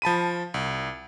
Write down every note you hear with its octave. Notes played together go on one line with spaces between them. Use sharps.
F3 A5 B5 D#7
C2